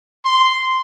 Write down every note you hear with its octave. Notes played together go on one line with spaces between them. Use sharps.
C6